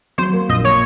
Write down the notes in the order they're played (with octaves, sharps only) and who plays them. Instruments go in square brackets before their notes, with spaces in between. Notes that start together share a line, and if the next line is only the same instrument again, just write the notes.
[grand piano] F#3 [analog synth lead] C5
[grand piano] A#3
[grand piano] A#1 [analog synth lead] D#5
[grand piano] A#2 [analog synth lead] C#5